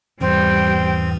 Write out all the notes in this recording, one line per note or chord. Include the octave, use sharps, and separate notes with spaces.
E2 G#2 E3 G3 C4 G5